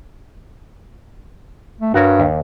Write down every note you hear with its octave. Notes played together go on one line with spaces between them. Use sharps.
A3
G2 F#4 A#4 C#5
D#2